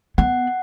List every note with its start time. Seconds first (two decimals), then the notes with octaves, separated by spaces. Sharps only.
0.18 B3 F#5